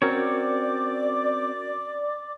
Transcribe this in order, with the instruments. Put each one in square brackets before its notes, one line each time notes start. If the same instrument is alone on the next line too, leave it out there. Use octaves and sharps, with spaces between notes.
[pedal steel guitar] C4 C#5 [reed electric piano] C#4 F#4 A#4 [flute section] D5 D6